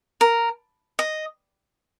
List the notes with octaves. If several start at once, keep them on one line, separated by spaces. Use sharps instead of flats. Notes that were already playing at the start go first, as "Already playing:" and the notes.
A#4
D#5